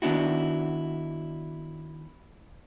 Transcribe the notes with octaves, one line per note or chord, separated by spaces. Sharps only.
D#3 B3 D4 E4 F#4